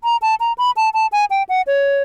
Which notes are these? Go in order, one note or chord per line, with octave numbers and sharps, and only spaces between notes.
A#5
A5
A#5
B5
A5
A5
G#5
G5
F#5
C#5